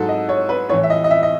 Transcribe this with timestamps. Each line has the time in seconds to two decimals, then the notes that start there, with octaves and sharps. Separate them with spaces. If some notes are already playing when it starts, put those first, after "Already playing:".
Already playing: G#2 F#3 A4
0.09 D#5
0.29 C#5
0.49 B4
0.69 A2 E3 C#5
0.83 E5
0.90 D#5
1.04 D#5
1.11 E5
1.23 D#5